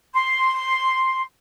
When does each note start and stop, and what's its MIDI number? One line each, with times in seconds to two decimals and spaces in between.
0.14 1.22 84